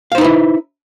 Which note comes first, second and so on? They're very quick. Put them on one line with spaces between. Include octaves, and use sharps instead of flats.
F5 C5 D#4 B4 E4